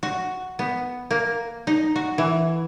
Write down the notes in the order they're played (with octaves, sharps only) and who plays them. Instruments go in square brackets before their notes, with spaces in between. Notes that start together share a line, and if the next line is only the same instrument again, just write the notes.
[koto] F#4
B3
A#3
D#4
F#4
E3